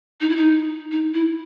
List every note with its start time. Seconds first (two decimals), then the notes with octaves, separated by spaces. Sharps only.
0.21 D#4
0.29 E4
0.36 D#4
0.91 D#4
1.14 E4